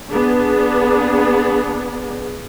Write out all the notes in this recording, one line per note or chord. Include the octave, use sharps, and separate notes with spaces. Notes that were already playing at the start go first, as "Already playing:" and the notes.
B3 D4 G#4